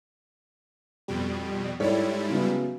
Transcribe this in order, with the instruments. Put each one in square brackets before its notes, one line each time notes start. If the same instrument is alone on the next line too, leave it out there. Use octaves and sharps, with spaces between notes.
[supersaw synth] F2 B2 G3
[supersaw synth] G#2 G3 E4 [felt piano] A4 C#5 D5
[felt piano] C#3 F#3 B3